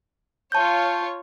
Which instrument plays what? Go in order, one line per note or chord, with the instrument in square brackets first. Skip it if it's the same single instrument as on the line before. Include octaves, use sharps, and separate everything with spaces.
[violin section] F4 C#5 [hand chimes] A5 G6